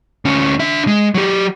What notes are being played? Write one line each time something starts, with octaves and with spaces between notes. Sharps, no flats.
D2 C#4
D4 E5
G#3
F#3 G4